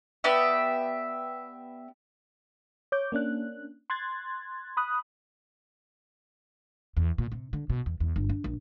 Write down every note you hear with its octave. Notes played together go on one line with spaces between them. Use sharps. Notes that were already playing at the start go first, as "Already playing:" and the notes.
B3 G4 D5 E5
C#5 D6 G6
A#3 C#4 D4 F#6
C6 F#6 G#6 A6
B5 D#6 F#6
E2
A#2
C3
D3
B2
E2
E2
G1
D4
A#1